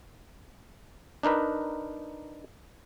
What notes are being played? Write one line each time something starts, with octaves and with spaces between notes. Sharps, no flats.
D4 D#4 A#4 B4